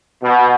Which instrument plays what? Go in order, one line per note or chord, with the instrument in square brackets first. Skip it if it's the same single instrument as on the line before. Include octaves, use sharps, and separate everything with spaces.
[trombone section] B2